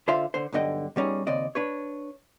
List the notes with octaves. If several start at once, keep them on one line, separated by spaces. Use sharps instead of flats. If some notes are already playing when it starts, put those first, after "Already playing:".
D3 F4 C5 E5 F5 C6
D3 C5
B1 G2 D3 D#5 G5
B2 G3 C#4 D#4 G#4
D#2 C#3 C4 D5 D#5
D4 B4 C#5